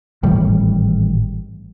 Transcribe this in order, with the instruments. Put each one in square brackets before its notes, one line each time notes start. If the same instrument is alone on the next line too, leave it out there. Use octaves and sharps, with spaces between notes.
[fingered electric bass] G#1 A2 E3 G3